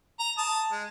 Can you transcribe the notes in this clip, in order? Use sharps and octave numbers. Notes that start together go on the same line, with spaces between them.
A#5
A5 D#6
G#3